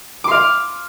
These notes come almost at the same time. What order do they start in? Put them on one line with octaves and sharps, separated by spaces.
D6 C6 F5